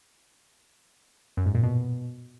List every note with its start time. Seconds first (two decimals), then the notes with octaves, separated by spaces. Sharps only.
1.37 F#2
1.46 G#2
1.55 A#2
1.63 B2